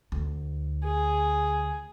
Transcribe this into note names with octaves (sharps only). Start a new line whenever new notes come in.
D2
G#4